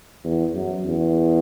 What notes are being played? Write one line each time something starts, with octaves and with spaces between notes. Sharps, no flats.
E2
F#2
E2